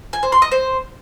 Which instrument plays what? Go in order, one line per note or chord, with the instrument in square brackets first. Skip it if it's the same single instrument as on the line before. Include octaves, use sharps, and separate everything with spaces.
[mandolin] G#5
C5
C6
D#5
C5